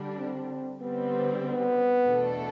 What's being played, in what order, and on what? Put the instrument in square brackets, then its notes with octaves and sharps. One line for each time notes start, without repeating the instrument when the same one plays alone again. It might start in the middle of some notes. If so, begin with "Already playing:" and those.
Already playing: [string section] D3 G3 D4
[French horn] C4
[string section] D3 G3 C4 [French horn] B3
[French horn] B3
[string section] E2 B2 A3 D4 A4